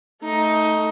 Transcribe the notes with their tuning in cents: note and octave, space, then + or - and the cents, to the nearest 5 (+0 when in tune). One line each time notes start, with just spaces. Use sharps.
A3 +0 D#4 +15